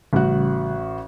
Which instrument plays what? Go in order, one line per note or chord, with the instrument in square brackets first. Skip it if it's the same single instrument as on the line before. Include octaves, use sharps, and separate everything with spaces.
[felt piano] A1 F#4 [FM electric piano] C#3 G3 F#6